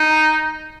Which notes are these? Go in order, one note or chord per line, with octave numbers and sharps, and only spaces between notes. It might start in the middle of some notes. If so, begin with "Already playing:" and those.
Already playing: D#4